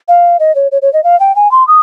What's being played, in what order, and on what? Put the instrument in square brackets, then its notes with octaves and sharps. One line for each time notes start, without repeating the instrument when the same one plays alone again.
[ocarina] F5
D#5
C#5
C#5
C#5
D#5
F5
G5
G#5
C6
D#6